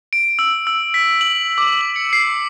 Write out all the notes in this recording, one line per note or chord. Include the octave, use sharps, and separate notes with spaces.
D7
E6
E6
B6
F#7
D6
F#7
C#7
C7